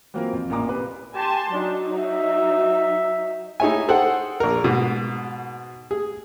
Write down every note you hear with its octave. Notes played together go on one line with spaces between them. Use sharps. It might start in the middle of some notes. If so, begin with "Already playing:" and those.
E3 F#3 A#3 C4 F4 A#4
F2
A1 A#2 A#3 A#5 D6
C3 B4
G4 G#5 A5 C6
F#3 D4 D#4
E5
D#4 E4 G#4 C#5 E5 G#5
G#4 A4 C5 F#5 G5
A#1 A#4
G#2 B2
G#4